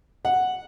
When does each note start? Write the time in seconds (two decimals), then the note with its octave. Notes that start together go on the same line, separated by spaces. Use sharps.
0.25 F#5